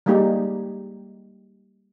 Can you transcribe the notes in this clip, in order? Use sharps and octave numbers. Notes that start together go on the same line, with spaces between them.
G3 G#3 A#3 D#4 G4